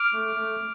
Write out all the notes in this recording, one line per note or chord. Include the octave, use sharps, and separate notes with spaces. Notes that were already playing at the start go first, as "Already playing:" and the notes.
Already playing: D6 F6
A3
A3